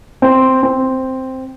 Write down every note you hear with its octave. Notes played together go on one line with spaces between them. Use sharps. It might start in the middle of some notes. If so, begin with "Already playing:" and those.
C4
C4